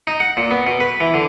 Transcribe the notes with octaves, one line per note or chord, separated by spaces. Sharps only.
D#4
F#5
A#2
B3
B2
B4
E3
D3